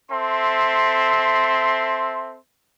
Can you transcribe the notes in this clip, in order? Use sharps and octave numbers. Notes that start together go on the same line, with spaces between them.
C4 A4 E5 C6